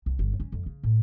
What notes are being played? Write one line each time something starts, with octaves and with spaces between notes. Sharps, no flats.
C2
G1
C#4
F2
C#3
A2